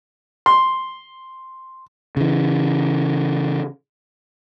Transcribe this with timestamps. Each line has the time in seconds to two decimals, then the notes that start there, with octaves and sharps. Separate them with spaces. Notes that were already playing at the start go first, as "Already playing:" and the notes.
0.46 C6
2.17 C#3 E3